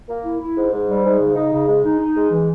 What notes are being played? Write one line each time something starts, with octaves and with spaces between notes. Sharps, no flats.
A#3
E4
E4
G#2
G#2
G3
G#2
C#3
D#4
C#3
G#3
D#4
D#4
G#3
E3